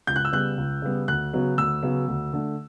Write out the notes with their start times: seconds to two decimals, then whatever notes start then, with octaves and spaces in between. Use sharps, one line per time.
0.07 C#2 G6
0.16 F#6
0.25 E6
0.33 C#3 G3 B3 F#6
0.57 C#2
0.82 C#3 G3 B3
1.08 D2 F#6
1.33 C#3 F#3 B3
1.58 D2 E6
1.83 C#3 F#3 B3
2.08 D2
2.33 D3 A3